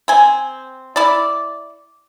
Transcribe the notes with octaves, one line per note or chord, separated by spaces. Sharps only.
C4 G#5
E4 D5